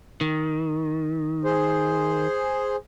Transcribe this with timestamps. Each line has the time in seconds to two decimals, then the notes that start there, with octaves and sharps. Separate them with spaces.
0.21 D#3
1.44 G#4 C5